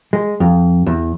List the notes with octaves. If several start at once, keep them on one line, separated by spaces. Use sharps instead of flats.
G#3
F2
E2